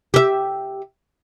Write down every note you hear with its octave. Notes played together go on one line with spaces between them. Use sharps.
G4 E5